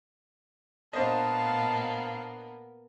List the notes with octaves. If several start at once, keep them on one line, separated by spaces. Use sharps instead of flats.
A#2 A#3 B3 D4 C5 D#5 F5 A5